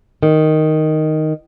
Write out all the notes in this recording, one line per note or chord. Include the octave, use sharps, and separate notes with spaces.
D#3